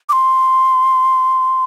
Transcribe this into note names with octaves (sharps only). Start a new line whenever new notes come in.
D6
C6